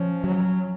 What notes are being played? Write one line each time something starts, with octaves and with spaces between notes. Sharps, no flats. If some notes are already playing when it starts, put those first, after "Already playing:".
Already playing: F3 C#4
F#3